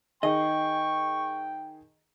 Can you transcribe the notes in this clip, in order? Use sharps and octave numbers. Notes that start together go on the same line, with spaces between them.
D#3 G#4 D#5 G5 C#6